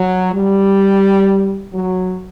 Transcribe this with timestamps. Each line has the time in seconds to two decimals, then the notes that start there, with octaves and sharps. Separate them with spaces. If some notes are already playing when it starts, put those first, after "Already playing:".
Already playing: F#3
0.32 G3
1.73 F#3